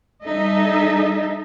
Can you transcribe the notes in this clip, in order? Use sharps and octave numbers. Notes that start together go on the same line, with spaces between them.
G3 D#4 A4 D#5 E5